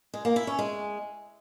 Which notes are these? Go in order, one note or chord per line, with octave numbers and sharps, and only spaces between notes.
G#3
A#3
E4
C#4
G#3